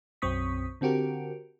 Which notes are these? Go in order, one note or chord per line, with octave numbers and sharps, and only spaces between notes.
B1 F#2 C4 C#6 D#6 B6
D3 C4 F#4 G4 A#4